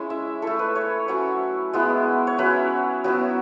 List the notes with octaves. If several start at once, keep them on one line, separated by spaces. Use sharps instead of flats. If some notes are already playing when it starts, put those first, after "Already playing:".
Already playing: G#3 C#4 E4
E5
A3 E4 A4
B4
C#5
F#3 C#4 E4 C#5
G#3 B3 E4
C#5
F#3 C#4 E4 B4
F#3 B3 E4